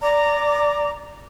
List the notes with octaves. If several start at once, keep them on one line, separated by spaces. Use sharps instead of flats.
D5 A#5 D6